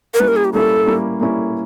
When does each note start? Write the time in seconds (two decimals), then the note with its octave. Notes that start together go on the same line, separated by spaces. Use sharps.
0.14 A#4
0.20 G3 A#3 C#4 E4 B4
0.28 A#4
0.36 G#4
0.45 G4
0.53 G3 A#3 C#4 E4 A4
0.86 G3 A#3 C#4 E4
1.19 G3 A#3 C#4 E4